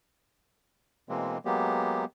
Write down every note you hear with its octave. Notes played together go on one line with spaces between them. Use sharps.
B2 E3 G#3 A#3 C4
F#3 G#3 A#3 B3 G4